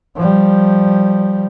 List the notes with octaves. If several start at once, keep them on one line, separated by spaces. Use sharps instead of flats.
F3 G3